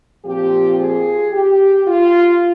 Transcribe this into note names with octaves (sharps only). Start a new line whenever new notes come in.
A#2 F3 C4 F4 G4
G#4
G4
F4